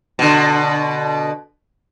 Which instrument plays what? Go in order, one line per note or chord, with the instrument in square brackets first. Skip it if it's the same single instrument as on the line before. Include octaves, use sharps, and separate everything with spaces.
[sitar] B2 D3